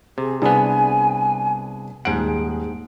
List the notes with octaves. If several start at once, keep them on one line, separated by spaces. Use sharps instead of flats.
C3 G#4
C2 B3 D4 G#4 G#5
D#1 G#2 G#4 F#5 D7